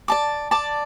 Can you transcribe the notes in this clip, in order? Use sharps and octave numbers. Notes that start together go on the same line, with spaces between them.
D5 A5 D6
D5 A5 D6